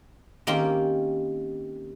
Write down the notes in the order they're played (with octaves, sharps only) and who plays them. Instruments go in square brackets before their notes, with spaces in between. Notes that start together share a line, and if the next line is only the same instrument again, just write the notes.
[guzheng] D#3 A#3 C4 C#4 G4